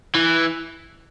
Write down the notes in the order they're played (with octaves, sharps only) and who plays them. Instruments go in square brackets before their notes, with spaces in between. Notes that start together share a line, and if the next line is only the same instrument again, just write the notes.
[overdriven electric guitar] E3